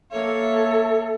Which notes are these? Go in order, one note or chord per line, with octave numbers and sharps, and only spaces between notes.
A#3 A4 C#5 E5